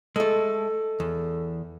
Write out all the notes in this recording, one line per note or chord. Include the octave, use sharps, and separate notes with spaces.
G#3 A3 A4
E2